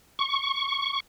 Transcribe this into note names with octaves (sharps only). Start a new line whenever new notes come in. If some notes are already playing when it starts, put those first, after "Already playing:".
C#6